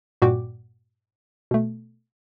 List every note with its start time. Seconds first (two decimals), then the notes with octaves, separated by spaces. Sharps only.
0.22 G2 A#2 F#4 D5 G5 D6
1.51 B2 A3